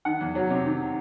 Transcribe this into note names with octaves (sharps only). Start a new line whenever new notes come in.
D#3 F#5
E2
F#3
C3
D#3